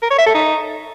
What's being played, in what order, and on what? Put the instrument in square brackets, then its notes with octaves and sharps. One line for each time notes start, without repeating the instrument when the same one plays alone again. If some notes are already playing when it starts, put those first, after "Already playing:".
[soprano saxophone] A#4
C#5
E5
A4
D#4